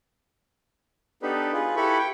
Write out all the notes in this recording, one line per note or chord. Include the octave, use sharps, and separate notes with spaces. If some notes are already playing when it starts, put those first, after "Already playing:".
B3 D4 D#4 G4 A4 B4
F4 G#4 B4
E4 G4 A4 B4 B5 C#6
G5